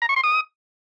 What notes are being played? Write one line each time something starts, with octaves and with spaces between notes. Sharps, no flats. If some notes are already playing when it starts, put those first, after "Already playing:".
A#5
C#6
C6
D#6